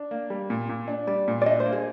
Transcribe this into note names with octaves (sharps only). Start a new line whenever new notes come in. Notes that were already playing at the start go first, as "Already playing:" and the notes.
Already playing: D4
A#3
G3
A#2
A#2
D4
G3 D5
A#2
D5
D4 D#5
C5
A#3
G#4